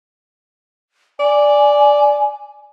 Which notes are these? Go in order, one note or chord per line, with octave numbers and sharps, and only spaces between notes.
D5 G#5